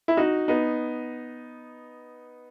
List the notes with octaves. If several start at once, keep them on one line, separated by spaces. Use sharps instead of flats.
E4
D#4 F#4
B3 D#4